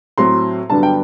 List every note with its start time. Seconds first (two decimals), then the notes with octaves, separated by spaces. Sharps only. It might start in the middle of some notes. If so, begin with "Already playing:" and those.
0.18 A2 F#3 C4 C6
0.69 G2 D3 F#3 B3 D4 A5
0.83 G5